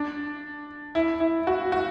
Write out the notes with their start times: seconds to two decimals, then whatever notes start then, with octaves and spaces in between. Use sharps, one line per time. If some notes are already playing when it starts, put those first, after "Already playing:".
Already playing: D4
0.95 E4
1.20 E4
1.47 F#4
1.72 F#4